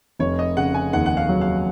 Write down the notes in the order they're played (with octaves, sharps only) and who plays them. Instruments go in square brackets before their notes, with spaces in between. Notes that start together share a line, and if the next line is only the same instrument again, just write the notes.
[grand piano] F1 [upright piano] C#5
[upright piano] D#5
[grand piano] C#3 [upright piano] F#5
[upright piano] G#5
[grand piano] D#2 [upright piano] F#5
[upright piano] F#5
F5
[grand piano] F#3
[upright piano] F5